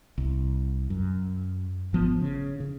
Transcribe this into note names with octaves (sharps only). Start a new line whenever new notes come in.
C2
F#2
G#1 F3 B3
C#3
C#3